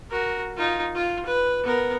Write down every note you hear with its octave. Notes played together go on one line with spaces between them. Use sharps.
F#4 A#4
D#4 F4
F4
B4
B3 A#4